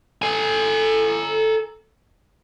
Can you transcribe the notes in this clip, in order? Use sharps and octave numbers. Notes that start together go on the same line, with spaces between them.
A4 G#5